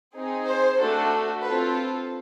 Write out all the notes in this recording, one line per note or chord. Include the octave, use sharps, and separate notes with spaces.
C4 D#4 G#4
C5
A3 D4 F#4 A4
C4 F4 A4 B4